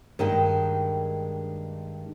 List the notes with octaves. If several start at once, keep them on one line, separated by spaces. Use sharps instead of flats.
G2 D#3 G#3 A#3 G5